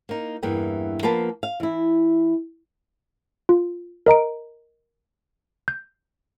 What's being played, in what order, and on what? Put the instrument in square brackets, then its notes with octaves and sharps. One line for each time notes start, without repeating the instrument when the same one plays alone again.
[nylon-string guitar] A#3 D#4
E2 G2 E3 A#3 G5
F3 A#3 B3 B4 A5
F5
E3 E4
[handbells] F4
A#4 D#5 A#5 D7
G6